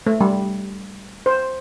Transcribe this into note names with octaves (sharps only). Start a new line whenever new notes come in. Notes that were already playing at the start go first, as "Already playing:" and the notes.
A3
G3
C5